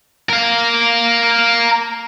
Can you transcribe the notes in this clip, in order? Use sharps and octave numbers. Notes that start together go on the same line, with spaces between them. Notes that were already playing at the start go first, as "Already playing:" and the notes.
A#4 F5